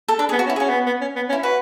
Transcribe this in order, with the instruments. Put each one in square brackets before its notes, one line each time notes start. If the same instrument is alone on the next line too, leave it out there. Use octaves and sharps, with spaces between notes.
[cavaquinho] A4
[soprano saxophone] D4 [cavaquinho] B4
[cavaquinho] G#4
[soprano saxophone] B3
[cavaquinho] F#4
[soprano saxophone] C#4
[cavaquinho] E4
G#4
[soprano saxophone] C#4 [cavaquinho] F#4
[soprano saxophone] B3
B3
C#4
B3
C#4
[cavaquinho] E4
[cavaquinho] F#4 [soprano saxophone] B4